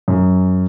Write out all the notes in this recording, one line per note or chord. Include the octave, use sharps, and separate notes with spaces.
F#2